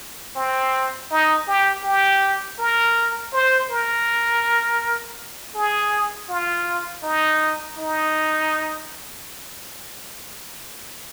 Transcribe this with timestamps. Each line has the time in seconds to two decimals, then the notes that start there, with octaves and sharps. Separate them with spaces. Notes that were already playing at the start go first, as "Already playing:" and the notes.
0.36 C4
1.11 D#4
1.48 G4
1.84 G4
2.59 A#4
3.33 C5
3.70 A#4
5.55 G#4
6.29 F4
7.04 D#4
7.78 D#4